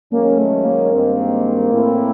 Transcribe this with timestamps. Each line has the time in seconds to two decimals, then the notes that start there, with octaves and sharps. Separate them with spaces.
0.12 F#2 D#3 G#3 A#3 C#4
0.38 A3
0.64 A#3
0.90 G2 D#3 G#3 C4
1.70 A2 E3 A3 C4 E4